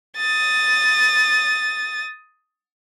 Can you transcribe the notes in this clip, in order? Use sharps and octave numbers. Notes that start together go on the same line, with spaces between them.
D#6 A6